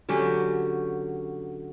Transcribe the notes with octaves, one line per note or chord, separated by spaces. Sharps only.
D3 F#3 C#4 G4